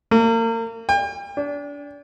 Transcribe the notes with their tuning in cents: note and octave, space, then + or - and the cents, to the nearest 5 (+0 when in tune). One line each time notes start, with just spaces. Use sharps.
A#3 -35
G5 +40
D4 -30